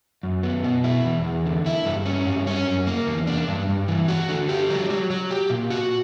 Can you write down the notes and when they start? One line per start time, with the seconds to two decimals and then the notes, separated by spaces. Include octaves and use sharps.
0.23 F#2
0.43 B3
0.64 B2
0.84 E4
1.05 E2
1.24 E2
1.46 D3
1.66 E4
1.85 G2
2.06 C#4
2.27 G2
2.47 C#4
2.67 F#2
2.87 A#3
3.07 E2
3.27 D4
3.48 G2
3.69 G2
3.88 E3
4.08 F#4
4.29 D3
4.49 G4
4.70 F#3
4.90 F#3
5.10 F#3
5.31 G4
5.50 A#2
5.70 F#4